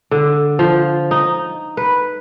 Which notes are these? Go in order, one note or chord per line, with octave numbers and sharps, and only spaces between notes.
D3
F3
D#4
B4